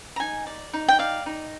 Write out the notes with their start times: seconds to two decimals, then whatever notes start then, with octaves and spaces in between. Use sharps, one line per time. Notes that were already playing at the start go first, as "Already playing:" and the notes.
0.16 A#5
0.20 D#4 G#5
0.47 D5
0.73 D#4
0.88 G5
0.99 D5 F5
1.26 D#4